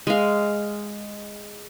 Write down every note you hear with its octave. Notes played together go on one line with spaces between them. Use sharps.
G#3 F5